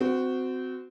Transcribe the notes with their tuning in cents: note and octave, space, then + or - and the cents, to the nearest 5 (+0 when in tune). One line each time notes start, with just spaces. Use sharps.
C4 -25 F#4 -5